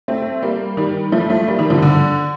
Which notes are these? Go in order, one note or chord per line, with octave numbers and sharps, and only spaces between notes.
A3 C4
G3 A#3
D#3 G3
F3 A3
F3 A3
G3 A#3
D#3 G3
D3 F3
D3